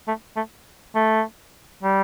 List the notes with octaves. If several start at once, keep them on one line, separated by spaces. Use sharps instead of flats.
A3
A3
A3
G3